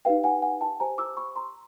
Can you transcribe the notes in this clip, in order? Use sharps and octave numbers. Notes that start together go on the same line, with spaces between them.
D#4 G4 B4 F5 G5
F#5 G#5
F#5 G#5
G5 A5
G4 C5 G#5 A#5
D6 E6
B5 C#6
A#5 C6